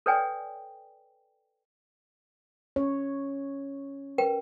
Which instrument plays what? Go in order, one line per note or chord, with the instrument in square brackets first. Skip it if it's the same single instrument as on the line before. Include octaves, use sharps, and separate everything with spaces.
[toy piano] A4 B4 C#5 D5 G5 G#5
[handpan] C#4 C#5
[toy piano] A#4 B4 G5